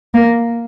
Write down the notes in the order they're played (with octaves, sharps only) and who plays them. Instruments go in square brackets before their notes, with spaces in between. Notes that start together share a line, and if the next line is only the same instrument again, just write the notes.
[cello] A#3